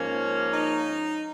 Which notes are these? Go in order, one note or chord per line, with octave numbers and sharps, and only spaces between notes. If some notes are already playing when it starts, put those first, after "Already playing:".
Already playing: G#2 F3 A#3 C#4
D#4